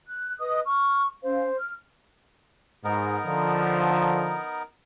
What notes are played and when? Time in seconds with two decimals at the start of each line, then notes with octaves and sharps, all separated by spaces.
0.07 F#6
0.40 B4 D#5 D#6
0.66 C#6 F6
1.23 C#4 C5 F5
1.58 F6
2.84 G#2 B3 D#4 A#4
3.26 D3 F3